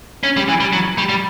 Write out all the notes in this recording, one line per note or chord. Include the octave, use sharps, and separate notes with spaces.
C#4
G3
E3
G3
F#3
G3
G3